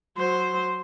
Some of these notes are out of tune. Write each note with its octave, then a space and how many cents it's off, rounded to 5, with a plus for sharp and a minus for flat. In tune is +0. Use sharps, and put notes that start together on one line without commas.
F#3 -10 C5 +0